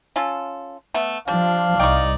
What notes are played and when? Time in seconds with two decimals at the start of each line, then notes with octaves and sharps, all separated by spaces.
0.16 C#4 F4 A4
0.94 A3 B3
1.28 F3 G3 D4 F5
1.79 C2 D#4 D5 G5 C#6